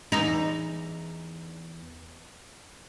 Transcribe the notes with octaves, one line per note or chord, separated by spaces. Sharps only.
E2 D#4